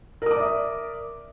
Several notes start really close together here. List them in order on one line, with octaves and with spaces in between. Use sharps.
A#4 D#6 D6 D5 E5